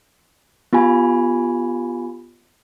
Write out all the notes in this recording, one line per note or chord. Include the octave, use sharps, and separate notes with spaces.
B3 F4 G4 G#5 B5